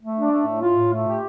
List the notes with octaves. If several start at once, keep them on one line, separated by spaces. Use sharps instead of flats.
A3
D4
A3
A2
F4
A2
A3
G4